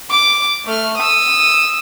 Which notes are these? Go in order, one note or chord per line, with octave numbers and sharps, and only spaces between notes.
D6
A3 F6
D#6 E6